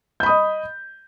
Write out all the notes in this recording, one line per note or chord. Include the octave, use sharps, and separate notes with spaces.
D#5 B5 D#6 G6